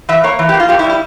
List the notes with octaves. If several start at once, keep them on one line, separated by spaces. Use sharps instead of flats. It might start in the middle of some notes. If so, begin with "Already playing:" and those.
E3 E5
A#3 C#5
E3
G4
A#3
F4
F2 G4
E4
G3
E4